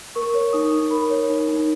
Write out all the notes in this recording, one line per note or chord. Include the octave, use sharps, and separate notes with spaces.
A#4 C#6
C#5
D#4 D#6
D#4
A#4 B5
C#5
D#4
D#4